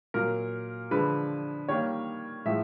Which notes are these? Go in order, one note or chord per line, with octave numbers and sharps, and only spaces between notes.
A#2 F#3 A#3 A#4
D3 F3 G#3 B4
D#3 G3 A#3 C#5
A2 F3 G#3 E5